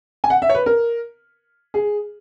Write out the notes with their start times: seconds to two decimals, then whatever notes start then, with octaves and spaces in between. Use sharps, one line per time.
0.24 G#5
0.30 F#5
0.42 E5
0.49 C#5
0.55 B4
0.66 A#4
1.74 G#4